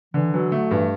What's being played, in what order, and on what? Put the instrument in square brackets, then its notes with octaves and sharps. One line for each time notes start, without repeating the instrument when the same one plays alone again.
[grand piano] D3 [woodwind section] E3
[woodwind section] E3 [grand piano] F#3
[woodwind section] D3 [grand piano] A3
[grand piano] G2 [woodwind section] E3